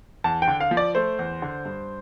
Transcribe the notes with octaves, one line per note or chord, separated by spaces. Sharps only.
E2 A5
G5
D3
F5
F3
D5
A3 C5
E2
D3
G2